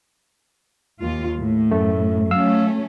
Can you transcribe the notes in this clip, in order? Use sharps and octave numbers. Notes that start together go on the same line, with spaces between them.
D#2 F4
A2
F#2 A3
F#3 A3 C#4 F5 E6